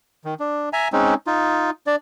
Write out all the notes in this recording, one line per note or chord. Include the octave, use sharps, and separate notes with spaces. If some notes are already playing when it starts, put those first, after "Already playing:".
D#3
D4
E5 G#5 A#5
G#3 C4 C#4 D#4
D#4 F4
D4 D5